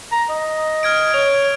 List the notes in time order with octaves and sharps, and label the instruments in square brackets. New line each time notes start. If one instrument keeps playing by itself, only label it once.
[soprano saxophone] A#5
D#5
[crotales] F6 G#6 D7
[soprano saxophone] C#5 [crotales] F7